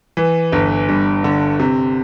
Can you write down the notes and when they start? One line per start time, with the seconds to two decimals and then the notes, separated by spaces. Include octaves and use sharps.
0.17 E3
0.52 G1
0.88 G2
1.24 D3
1.59 C3